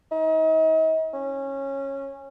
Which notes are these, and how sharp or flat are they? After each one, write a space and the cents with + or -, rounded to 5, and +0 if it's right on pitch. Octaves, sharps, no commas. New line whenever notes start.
D#4 +40
C#4 -15